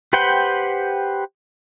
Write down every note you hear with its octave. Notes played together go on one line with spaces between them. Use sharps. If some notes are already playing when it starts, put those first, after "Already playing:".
G4 B4 C5 F#5 G5